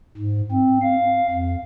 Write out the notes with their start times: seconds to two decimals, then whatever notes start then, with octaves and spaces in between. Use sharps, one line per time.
0.17 G#2
0.52 C4
0.82 F5
1.30 F2